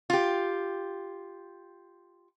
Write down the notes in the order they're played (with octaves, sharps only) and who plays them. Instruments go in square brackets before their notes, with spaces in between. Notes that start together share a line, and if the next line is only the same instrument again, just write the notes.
[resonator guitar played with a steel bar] F4 G4